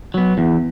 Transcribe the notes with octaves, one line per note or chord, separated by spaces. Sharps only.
F#3 B3
E2